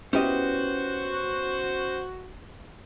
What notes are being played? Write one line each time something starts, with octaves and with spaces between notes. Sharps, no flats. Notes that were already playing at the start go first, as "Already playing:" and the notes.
B3 C#4 E4 F#4 G4 C5 D#5